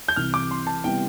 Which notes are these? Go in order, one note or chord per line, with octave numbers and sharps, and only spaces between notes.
G6
C2 C3 E3 F6
D6
C6
A5
C3 G3 B3 E4 G5